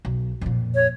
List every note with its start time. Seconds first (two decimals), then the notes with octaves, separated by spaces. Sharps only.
0.05 B1
0.41 F2 A#2
0.75 C#5